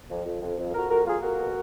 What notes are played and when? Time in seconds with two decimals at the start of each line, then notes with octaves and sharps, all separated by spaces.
0.10 F2
0.26 F2
0.42 F2
0.59 F2
0.74 F2 F#4 A#4
0.90 F2 F#4 A#4
1.06 A#3 F4 G#4
1.23 F2 F#4 A#4
1.39 B2